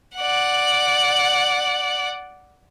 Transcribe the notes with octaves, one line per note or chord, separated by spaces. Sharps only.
D5 F#5